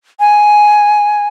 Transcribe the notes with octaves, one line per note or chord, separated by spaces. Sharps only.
G#5